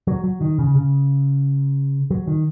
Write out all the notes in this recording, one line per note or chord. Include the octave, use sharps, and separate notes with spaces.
F#3
F#3
D#3
C#3
C#3
F#3
D#3